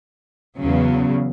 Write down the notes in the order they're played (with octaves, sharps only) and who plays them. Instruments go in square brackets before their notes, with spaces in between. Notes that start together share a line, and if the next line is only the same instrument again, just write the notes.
[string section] E2 C#3 F#3